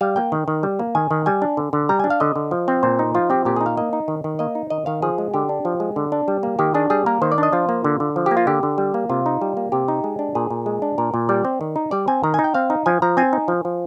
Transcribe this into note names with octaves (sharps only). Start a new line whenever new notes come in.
G3 F5
A#3 G5
D#3
D#3
G3
A#3
D#3 G#5
D#3
G3 G#5
D4
D3
D3
G3 A#5
D4 G#5
F5
D3 D#5
D3
F3
C4
A#2 C5
D#4
F3 F4
C4 G4
A#2 G4
D#4 G#4
F5
A#3 D#5
D#4
D#3
D#3
A#3 D#5
D#4
D#3 D#5
D#3 F5
F3 G#4
G#3
D3 G4
D4
F3
G#3
D3
D4
G3
A#3
D#3 G4
D4 G#4
G3 G#4
A#3 A#4
D#3 C5
D5
D4 D#5
F3 F4
A#3
D3
D3
F3
G4
A#3
F4
D3 G4
D3
G3
A#3
C3 F4
D#4
G3
A#3
C3 G4
D#4
G#3
D4
A#2 G#4
A#2
G#3
D4
A#2 A#4
A#2
G3 D5
C4
D#3
D#4
G3 D5
C4 G#5
D#3 A#5
G#5
D#4
G5
C4 F5
D#4
F3 G#5
F3 A#5
C4 G#5
D#4
F3
F3